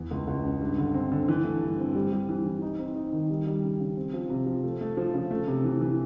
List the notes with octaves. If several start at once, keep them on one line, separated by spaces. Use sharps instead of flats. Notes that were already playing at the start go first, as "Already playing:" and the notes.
Already playing: E2 E3
C#2
C#2
C#3
G2
D3
C4
D3
E3
A3
G2
C4
G3
G3
E3
E3
D#4
C4
D#4
D#3
G3
G3
C#3
C#3
C4
F3
C3
F3
A3
A3
F3
C#3
A3
C3
E3
E3